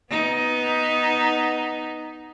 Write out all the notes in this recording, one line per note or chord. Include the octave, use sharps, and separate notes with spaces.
B3 D#4